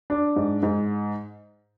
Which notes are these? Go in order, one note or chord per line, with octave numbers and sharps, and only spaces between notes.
D4
G#2
G#2